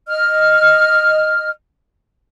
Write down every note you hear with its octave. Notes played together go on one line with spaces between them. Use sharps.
D#5 F6